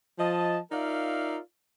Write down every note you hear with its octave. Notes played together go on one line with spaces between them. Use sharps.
F3 D#5 A5
D#4 F4 A#4 D5 E5 F5